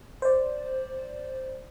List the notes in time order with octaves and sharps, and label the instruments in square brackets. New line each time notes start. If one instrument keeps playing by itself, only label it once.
[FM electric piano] C5 D5